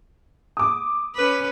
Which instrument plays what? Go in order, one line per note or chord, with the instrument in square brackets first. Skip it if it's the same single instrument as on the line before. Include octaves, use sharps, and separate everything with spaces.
[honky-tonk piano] D6 D#6
[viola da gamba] C#4 B4